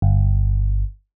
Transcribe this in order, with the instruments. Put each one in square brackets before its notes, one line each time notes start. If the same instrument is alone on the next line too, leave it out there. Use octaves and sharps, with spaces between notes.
[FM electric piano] G1